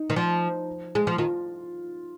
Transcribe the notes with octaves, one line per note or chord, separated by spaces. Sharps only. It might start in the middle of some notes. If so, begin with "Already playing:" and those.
Already playing: D#4
D#3
F3
G#3
F3
D#3 F4